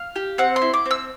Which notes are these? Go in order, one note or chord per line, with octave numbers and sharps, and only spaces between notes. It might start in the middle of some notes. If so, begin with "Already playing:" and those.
Already playing: F5
G4
C4 F#5
C6
E4
D6
C4 E6